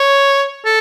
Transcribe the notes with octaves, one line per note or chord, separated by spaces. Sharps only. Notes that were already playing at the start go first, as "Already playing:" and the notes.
Already playing: C#5
A4